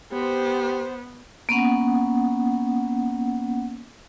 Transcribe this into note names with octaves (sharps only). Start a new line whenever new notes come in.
B3 G4 C5
A#3 B3 C#4 F#5